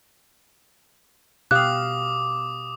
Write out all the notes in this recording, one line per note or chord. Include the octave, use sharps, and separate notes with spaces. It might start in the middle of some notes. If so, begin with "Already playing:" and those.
B2 G4 F5 D6 D#6 F#6